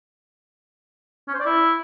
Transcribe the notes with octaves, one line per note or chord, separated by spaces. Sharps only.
C#4
C5
D5
E4